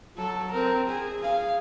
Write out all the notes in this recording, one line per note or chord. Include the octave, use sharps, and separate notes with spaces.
F#3 A4
C4 A#4
G#4
G#4 F5